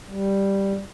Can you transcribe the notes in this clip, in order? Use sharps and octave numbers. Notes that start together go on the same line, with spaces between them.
G3